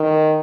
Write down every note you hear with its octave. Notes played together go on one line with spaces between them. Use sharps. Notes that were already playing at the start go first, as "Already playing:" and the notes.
Already playing: D#3